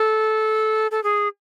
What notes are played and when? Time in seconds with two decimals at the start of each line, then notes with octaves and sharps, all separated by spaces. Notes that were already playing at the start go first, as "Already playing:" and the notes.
Already playing: A4
0.91 A4
1.03 G#4